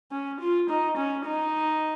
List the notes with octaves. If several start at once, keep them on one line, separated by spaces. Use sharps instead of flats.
C#4
F4
D#4
C#4
D#4